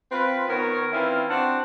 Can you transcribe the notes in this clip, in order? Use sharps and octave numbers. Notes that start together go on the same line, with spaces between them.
C4 F4 B4
D#3 B3 A#4 C#5
E3 C4 C#4 E4 F4
C4 D4 F#4 F#5 A5